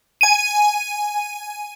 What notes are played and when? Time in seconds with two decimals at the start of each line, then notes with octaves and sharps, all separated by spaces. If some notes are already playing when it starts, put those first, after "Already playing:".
0.21 G#5 D#7